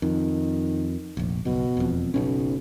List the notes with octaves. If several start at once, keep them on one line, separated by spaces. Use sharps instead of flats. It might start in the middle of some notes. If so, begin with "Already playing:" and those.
F2 D#3
F1 A#1
F#1 B1 B2
E1 F2
F#1 B1 B2 C#4